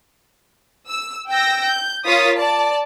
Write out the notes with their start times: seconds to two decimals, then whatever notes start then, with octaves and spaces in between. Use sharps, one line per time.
0.88 E6
1.28 G5 E6 G6 A#6
1.64 G6
2.06 F4 A#4 C#5 D#6 A6 B6
2.38 D5 A5